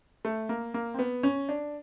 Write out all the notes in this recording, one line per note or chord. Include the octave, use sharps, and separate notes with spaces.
A3
A#3
A#3
C4
B3
C#4
D4